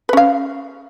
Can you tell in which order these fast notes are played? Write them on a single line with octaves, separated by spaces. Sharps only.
B4 C#4 F5